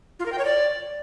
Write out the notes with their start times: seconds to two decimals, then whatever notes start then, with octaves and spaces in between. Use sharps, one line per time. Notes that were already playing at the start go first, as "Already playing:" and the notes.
0.19 F4
0.26 A#4
0.32 G5
0.38 C#5
0.45 D5